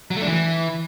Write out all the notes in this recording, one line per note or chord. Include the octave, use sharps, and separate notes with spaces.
F#3
A3
D4
E3